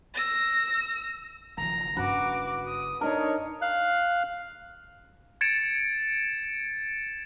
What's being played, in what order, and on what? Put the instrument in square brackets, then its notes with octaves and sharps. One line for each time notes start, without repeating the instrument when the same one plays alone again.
[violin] E6 A#6
[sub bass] F#1 [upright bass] D#3 F3 [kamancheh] A#5
[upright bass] G2 C#4 [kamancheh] F#4 D6 [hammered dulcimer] B4
[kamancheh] D#6
[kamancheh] D4 C#5 [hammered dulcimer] D#4 A#4
[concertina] F5 F#6
[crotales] G#6 A6 C#7 D7 E7